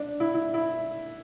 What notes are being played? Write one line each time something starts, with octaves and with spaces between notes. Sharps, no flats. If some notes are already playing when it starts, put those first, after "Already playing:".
Already playing: D4
E4
E4
E4